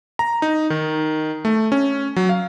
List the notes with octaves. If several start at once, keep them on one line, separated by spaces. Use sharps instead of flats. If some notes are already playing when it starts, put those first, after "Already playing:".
A#5
D#4
D#3
A3
C#4
F#3
F5